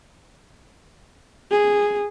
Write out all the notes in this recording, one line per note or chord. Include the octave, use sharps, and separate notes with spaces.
G#4